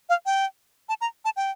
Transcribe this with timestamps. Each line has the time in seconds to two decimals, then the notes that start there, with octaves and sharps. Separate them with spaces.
0.09 F5
0.26 G5
0.89 A5
1.01 A#5
1.25 A5
1.36 G5